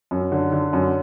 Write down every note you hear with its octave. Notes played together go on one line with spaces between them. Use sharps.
F#2
D3
D3
F#2